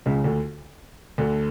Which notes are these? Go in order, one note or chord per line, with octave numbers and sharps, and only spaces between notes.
C#2 C#3
D2 D3
D2 D3